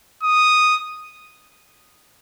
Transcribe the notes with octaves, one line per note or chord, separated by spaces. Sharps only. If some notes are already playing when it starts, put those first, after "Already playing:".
D#6